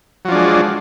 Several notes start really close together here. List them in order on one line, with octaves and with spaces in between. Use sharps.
F#3 F3 D4 G#3